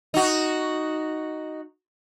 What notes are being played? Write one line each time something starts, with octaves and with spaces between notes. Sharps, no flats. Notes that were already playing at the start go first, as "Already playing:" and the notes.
D#4 F#4